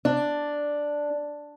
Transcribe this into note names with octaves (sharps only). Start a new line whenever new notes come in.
D4